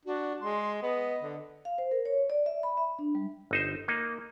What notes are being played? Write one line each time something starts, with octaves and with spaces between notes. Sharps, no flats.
D4 F#4
G#3 C6
B3 D#5
D3
F5
C5
A#4
C#5
D5
E5
B5
E5
D4
G3
G1 D#4 C5
A#3 D#4